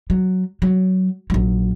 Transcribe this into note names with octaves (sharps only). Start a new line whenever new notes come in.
F#3
F#3
A#1 F#3